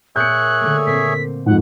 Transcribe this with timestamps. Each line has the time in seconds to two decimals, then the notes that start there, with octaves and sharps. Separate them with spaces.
0.16 A#2 G#4 C#5 E5 F#6 G6 C#7
0.61 D3 A3 A#3
0.86 A#2 C4 B6 C7
1.46 F2 G#2 F#5